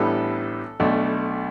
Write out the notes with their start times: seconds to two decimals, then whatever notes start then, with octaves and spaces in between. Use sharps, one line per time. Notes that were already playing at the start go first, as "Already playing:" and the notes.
Already playing: A1 A2 G3 B3 D4 A4
0.80 B1 B2 A3 D4